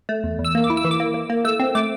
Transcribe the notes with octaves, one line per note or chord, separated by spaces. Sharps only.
A3
E2
E2
E6
A#3
D6
E4
E6
E3
D6
A#3
A#3
A#3
A3 E6
C4
A3 D6